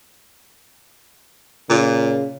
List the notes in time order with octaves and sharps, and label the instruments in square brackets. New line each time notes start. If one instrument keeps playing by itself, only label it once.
[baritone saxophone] A#2 [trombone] C#3